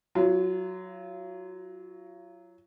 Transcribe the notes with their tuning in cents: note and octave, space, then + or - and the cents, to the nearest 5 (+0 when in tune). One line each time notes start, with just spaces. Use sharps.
F#3 +0 F4 -35